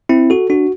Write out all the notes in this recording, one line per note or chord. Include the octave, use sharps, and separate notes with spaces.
C4 E4
F#4 A4
D4 F#4